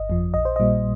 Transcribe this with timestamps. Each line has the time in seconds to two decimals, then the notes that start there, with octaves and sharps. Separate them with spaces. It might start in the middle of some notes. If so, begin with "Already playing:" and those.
Already playing: G1 D#5
0.10 F2 F3
0.34 A#1 D#5
0.45 C5
0.56 A#2 G3 D#5